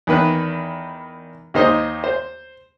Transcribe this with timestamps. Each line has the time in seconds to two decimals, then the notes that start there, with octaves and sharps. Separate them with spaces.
0.07 E2 D#3 B4 F#6
1.54 D#2 D#4 C5 D#5
2.04 C5